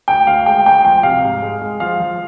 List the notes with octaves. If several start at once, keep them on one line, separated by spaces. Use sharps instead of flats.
D2 G5
D2 F5
G#3 G5
D2 G5
F3 G5
C3 F5
G#2
G#3
G#3
F3 F5
F3